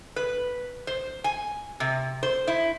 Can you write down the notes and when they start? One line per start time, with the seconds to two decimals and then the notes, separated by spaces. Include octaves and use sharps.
0.16 B4
0.87 C5
1.24 G#5
1.80 C3
2.23 C5
2.47 E4